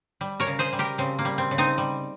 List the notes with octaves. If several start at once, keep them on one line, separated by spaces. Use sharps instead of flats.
G3
A#4 C#5
C#3
G#4 C5
G3
G4 A#4
C#3 C4
A#3
G3
C4
C#3
C4 D#4
G3